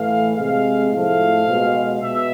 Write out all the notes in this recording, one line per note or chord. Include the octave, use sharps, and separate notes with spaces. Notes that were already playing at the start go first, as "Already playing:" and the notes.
Already playing: A2 E3 A3 F5
C3 G#3 F5
A2 F3 A3 F5
B2 G#3
B2 E5